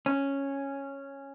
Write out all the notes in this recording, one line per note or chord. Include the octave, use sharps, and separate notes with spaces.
C#4